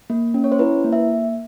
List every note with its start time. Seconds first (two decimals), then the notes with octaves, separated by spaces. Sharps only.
0.10 A#3
0.34 C#4
0.44 C#5
0.52 C5
0.59 E4 B4
0.85 A#3
0.93 E5